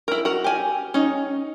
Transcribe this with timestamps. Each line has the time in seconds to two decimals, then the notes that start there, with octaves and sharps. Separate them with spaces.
0.08 E4 A#4
0.25 F#4 A#4
0.44 G4 G#5
0.94 C#4 D#4